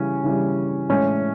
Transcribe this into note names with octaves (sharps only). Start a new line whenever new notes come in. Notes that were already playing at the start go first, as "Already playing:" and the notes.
Already playing: C#3 E3 G3 C#4
C#3 E3 G3
A2 E3 G#3 C#4